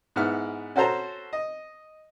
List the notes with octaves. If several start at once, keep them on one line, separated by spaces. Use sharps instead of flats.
G#2 B3 E4 F6
C#4 F#4 A4 C5 A5 A#5
D#5